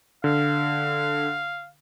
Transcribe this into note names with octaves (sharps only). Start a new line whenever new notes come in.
D3 F5